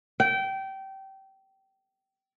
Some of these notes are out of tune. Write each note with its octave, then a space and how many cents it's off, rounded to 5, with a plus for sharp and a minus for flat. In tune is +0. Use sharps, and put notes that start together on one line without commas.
G5 -20